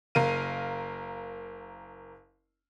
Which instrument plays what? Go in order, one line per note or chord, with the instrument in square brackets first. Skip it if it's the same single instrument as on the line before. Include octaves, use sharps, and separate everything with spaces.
[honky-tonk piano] F#1 A#4 F5 D#7